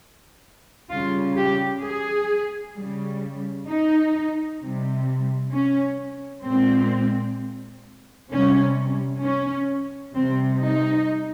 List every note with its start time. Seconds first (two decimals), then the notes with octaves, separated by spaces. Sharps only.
0.90 C#3 G3 F4
1.36 G4
1.82 G#4
2.74 C#3 G3
3.68 D#4
4.60 C3 G3
5.52 C#4
6.44 A#2 G#3 C4
8.30 C3 G3 C#4
9.22 C#4
10.15 C3 G3 C4
10.61 D#4